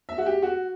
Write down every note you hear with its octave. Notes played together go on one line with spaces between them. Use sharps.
E5
F#4
G4
F#4